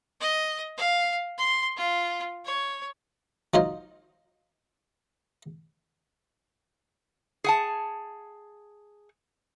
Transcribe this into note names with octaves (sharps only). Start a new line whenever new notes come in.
D#5
F5
C6
F4
C#5
F#3 D#4 F4 C5 D#5
G#4 F#5 A5